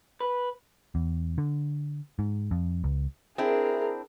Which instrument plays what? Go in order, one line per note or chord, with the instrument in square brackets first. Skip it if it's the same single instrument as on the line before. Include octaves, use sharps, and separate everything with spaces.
[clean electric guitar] B4
[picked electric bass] E2
D3
G#2
F2
C#2
[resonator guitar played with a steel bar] C4 D4 E4 [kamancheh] G#4 A#4